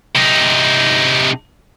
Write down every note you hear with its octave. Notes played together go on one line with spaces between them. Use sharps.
C3 D#4